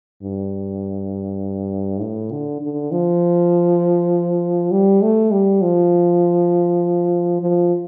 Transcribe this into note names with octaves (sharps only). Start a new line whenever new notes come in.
G2
A2
D3
D3
F3
G3
A3
G3
F3
F3